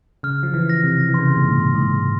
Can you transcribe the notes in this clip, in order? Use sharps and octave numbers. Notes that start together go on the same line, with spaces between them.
C#3 F6
F3
E3
A#6
C3
E3
C#3 C6
C3
A#2
G#2
C6
G#2